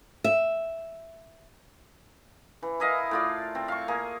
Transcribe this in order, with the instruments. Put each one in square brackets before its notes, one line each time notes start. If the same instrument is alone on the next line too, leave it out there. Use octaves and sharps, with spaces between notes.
[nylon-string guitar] E5
[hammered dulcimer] E3
E4 A#4 D#5 F5
A2 F4 D5
C4
F5 C#6
A#3 G#4